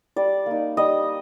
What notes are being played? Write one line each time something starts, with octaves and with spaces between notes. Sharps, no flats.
G3 D5
A#3 D#4
G3 D#5